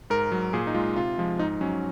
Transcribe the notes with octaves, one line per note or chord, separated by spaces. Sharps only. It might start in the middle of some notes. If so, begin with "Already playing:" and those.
G#2 A#4
F#3
A#2 G#4
D#4
G#3 F4
C3 F4
F3 G#3
G#2 D#4
F#3 C#4